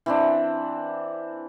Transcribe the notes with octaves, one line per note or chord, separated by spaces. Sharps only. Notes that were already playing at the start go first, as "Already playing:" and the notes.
E3 C4 D4